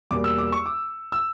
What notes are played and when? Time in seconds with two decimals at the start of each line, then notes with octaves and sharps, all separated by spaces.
0.11 E2 B2 G3 A#3 D6
0.24 E6
0.38 D6
0.52 C#6
0.66 D6
1.12 E6